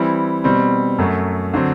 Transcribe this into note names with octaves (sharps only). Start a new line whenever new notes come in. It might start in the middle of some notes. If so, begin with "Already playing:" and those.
Already playing: E3 G3 C4 E4
B2 G3 C4
F#2 F#3 A3
D3 F#3 C4